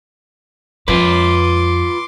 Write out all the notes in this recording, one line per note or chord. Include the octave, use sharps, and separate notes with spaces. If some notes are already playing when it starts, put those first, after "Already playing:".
F2 F4 B4 C6 D6